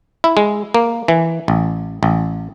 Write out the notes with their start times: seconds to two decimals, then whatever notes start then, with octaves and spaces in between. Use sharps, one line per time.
0.24 E4
0.37 G#3
0.74 A#3
1.08 E3
1.48 A1
2.03 A1